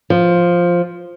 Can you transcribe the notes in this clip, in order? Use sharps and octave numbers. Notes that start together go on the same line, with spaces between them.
F3